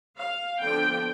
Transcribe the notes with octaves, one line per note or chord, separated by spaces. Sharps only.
F5
D3 F3 B3 D4 F4 G5